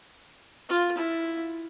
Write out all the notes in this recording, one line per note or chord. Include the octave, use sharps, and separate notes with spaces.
F4
E4